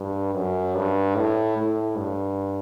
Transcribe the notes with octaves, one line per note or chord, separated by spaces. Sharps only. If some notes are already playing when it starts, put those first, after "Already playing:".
Already playing: G2
F#2
G2
A2
A2
G2